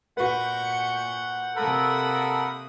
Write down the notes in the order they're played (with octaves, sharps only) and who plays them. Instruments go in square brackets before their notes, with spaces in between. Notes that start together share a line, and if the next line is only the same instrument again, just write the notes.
[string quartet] A#2 C#6 G6 [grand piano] F#4 B4 [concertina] F#5
[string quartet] C3 A#3 D#6 [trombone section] A4 [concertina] A#4 F#5 B5